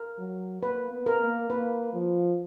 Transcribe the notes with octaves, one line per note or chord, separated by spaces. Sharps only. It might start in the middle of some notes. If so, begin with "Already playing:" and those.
Already playing: A#4
F#3
A#3 B4
B3
A#4
A#3
A#3 B4
F3